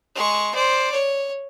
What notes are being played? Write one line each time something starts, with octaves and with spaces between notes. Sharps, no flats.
G#3 C#6
C5 D5
C#5